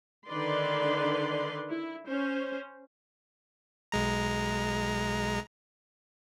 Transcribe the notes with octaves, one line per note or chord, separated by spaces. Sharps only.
D3 D#3 B4 D5 C6
E4
C#4 C5
B1 G#3 A#5